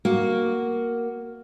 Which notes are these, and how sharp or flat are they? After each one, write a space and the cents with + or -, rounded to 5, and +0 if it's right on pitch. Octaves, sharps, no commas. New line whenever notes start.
A#3 +0 F#4 +0